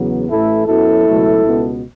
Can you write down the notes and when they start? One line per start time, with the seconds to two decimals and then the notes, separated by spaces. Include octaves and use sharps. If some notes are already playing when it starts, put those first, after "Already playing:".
Already playing: E2 C#3 F#3 B3
0.29 A1 A2 E3 A3 E4 A4
0.67 F#2 F#3 B3 E4 A4
1.06 C#2 B2 F#3 A3
1.44 C#2 B2 B3